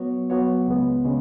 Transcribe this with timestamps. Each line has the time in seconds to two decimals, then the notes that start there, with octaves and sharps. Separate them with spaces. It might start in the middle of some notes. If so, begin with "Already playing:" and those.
Already playing: F#3 B3 F#4 C#5
0.30 F#3 B3 F#4 C#5
0.66 C#2 C#3 G#3 B3
1.05 C#3 G#3